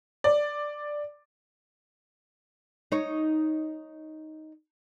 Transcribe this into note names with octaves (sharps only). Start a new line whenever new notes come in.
D5
D#4 C#5